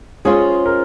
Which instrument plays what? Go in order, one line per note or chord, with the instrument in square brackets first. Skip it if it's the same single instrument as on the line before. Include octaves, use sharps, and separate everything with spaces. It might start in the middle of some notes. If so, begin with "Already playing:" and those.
[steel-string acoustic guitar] G#3 C#4 F4 C5 [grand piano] G#4
[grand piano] A#4